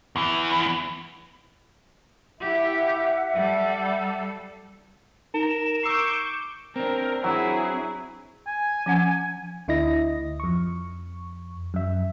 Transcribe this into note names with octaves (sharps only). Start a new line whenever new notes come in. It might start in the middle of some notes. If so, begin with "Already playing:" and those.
E2 E3
E4 G4 E5 F#5
G3 A4
D#4 A#4 E7
C#6 D6 E6 G6 C7
C4 D4 A#4
F#3 E4 G#4
G#5
F3 C#4 F#5
D2 D3 E4 D#5 A#6
F2 C#6
F#2 E5